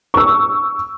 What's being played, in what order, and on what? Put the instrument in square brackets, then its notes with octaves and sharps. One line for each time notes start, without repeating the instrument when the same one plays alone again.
[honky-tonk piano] C#6 E6